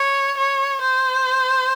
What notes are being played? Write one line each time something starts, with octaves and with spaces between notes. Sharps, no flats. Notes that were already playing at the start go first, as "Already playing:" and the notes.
Already playing: C#5
C#5
C5